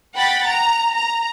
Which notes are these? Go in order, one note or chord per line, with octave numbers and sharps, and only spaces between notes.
F#5 G5 B5 A6
A#5
A#5